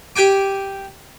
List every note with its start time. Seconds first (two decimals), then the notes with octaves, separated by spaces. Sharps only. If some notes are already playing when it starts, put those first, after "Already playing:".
0.16 G4 G5 G#5 D6